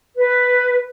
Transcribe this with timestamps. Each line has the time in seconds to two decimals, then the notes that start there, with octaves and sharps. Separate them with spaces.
0.16 B4